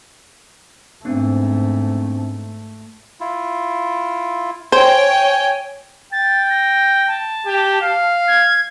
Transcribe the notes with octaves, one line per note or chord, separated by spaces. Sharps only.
G#2 A3 B3 C4 D4
A3
E4 F4
C5 C#5 G5 G#5
G5 A6
A#6
A5
G4
F5
G#6